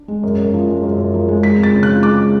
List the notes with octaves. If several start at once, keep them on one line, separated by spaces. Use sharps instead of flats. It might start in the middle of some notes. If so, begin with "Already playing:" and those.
Already playing: D4
G#3
F#2
F#2
F3
G#3
F#2
F#2
F3
G#3
G#3 B6
F2
A6
C#3
F#6
F3
G#3 D6